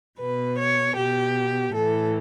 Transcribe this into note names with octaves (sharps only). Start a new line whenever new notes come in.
B2 B4
C#5
B2 G4
A2 E3 A4